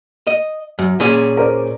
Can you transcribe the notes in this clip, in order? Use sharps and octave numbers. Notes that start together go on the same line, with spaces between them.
D#5
F#2
A#2 C#4 G#4
A#4 C5 D5